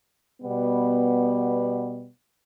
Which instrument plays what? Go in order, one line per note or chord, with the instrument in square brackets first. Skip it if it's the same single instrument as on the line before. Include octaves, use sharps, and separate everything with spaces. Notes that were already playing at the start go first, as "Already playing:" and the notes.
[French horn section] B2 G3 B3